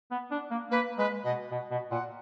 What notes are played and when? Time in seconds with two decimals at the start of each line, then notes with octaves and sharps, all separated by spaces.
0.11 B3
0.31 D4
0.51 A#3
0.71 A#3 B4
0.98 G#3 B4
1.24 B2 D#5
1.52 B2
1.71 B2
1.91 A#2 F#5